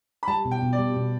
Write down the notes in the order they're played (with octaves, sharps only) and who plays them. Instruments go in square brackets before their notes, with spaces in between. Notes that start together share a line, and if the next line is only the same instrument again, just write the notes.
[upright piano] B5
[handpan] G3 [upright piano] A5
[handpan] B2
[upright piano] G5
[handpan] B2
[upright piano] D5
[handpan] G3
B2